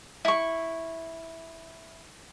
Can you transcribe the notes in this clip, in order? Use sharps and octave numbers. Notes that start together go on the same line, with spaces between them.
E4 C#6